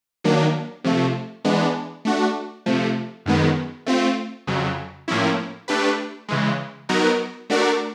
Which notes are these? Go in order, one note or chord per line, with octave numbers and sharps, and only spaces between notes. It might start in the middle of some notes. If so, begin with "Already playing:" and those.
D#3 F#3 A#3 D4
C3 F3 A3
E3 G#3 B3 D4
A3 D4 F#4
C3 F3 A3
F#2 D#3 G#3 B3
A3 C4 F4
F2 C#3 F#3
A2 F3 A#3 C#4 E4
A3 D4 G4 B4
C#3 E3 G#3
F#3 B3 D#4 F#4 A#4
A3 D4 F#4 A#4 D5